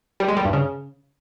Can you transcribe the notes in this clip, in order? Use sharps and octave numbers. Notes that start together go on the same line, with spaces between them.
G3
G#3
G3
G2
C#3